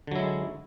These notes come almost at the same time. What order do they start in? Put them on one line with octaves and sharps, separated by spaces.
D3 F#3 E4 G#3